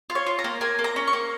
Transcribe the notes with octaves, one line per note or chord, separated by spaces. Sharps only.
F4
C#5
F4
A#5
A#3
A#3 G#5
A#3
A#5
C#4
C#6
A#3